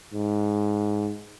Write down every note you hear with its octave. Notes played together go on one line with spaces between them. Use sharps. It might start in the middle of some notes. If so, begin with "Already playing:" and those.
G#2